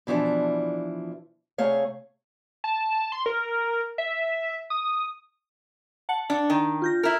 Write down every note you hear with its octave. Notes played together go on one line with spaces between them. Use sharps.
B2 E3 F3 D4 E4
C3 A3 G#4 C#5 F5
A5
C6
A#4
E5
D#6
F#5 A5 C#7
D4
D#3 G5
F4 G6 A#6
E4 A#4